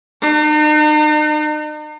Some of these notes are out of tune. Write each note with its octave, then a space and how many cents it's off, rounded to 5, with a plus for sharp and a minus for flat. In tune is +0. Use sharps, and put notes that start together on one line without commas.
D#4 -45